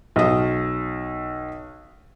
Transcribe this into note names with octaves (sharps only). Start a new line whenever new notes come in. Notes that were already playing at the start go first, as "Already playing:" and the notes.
B1 D#6